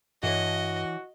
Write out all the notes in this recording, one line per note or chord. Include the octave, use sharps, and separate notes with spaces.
G2 E3 F#4 C#5 D#5